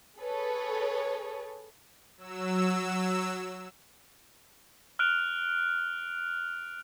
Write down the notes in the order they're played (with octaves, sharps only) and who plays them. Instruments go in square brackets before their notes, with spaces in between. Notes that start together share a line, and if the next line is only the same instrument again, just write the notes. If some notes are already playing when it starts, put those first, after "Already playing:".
[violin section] G#4 A4 B4 C#5
[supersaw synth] F#3 E6
[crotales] F6 F#6 D7 F7